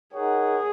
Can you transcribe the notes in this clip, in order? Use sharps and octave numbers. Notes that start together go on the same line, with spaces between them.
D#4 G#4 A#4 C#5 F#5